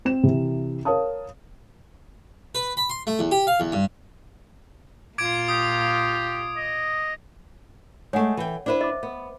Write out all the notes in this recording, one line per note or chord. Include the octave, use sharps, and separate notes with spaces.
C4 E7
C3 E3
A#4 C#5 F5 A5 D#6
B4
B5
C6
A3
E2
G4
F5
E2
G2
A#2 F4 D6 G#6 D7
G4 D#6
D#5
G#3 A3 C#5 F#5 G#5
E3 G5
D4 E4 B4 C5 D5
D#5 E5 D6
B3